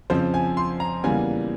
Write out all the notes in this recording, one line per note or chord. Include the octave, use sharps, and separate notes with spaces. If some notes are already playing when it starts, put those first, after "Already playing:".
F2 C#3 F3 C5
G#5
C6
A#5
E2 C#3 E3 G3 A#3 G#5